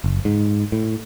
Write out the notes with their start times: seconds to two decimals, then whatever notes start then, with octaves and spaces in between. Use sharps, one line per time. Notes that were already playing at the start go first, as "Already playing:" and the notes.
0.04 F#1
0.25 G#2
0.72 A2